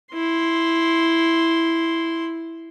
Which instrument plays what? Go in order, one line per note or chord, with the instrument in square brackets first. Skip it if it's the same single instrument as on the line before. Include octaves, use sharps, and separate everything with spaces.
[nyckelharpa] E4 C6